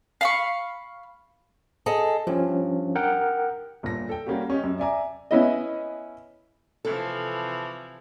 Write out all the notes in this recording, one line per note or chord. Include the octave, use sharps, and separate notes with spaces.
F5 B5 C#6
G#4 A4 D#5
G2 F3 C#4
A#4 F#5 G5
G1 A#2 A#6
A4 G5
G3 A#3 C#4 F#4 G4
C#4 G4 D#5
F#2
D5 E5 G#5 A#5 D6
B3 C#4 E4 D#5
C3 E3 F3 A4